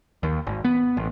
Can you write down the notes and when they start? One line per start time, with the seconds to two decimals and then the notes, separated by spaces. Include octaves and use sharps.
0.23 D#2
0.47 G#1
0.65 B3
0.97 A1